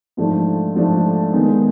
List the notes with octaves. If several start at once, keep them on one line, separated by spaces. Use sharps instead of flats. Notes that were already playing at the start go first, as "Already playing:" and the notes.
G#2 F3 A3 D4
G#2 F3 A3 D4
D#3 G#3 B3 D#4